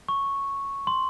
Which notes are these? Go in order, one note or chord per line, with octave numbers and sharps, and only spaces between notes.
C#6
C6